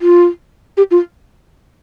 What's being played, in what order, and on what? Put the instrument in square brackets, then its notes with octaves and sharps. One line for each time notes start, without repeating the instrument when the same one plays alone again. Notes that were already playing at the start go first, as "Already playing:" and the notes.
[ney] F4
G4
F4